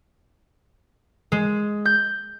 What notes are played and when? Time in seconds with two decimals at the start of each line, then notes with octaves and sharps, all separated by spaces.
1.32 G#3
1.85 G6